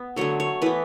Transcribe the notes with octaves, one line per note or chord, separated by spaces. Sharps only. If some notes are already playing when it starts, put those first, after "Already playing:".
Already playing: B3
D3 F#3 A3 C#5
C#5
E3 B3 B4